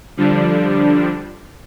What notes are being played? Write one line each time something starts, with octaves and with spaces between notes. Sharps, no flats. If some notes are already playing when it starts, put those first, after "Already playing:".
D3 F3 G3 D4